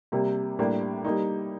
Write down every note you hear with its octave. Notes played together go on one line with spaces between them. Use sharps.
C3 G3 A#3
A2 G3 A#3 D4 G4
G3 A#3 D#4